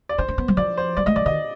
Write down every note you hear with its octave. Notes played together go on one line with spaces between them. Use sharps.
D5
D4 C5
D4
B3
G3
F3 D5
C5
G3 D5
G#3 D#5
F3 D5
D#3 D#5